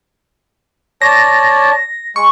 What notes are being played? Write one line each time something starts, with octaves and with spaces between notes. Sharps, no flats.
C#5 D5 A5 A#6
G#3 C#6